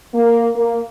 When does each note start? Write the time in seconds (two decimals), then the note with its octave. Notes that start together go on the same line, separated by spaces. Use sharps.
0.14 A#3
0.56 A#3